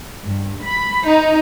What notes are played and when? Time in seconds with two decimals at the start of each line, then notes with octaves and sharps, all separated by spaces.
0.24 G2
0.63 B5
1.06 D#4